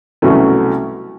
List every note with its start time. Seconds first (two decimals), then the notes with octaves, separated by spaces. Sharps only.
0.22 C2 B2 F#3 A3 C#4